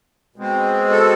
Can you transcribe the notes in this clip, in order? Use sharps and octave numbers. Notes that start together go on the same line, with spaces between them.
B2 G#3 C4
A4